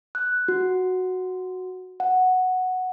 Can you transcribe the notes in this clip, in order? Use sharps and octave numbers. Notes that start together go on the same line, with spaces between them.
F#6
F#4
F#5